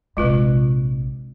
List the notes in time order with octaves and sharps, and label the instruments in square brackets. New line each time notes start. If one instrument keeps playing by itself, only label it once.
[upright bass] A#1 C3 [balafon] G#3 F4 B4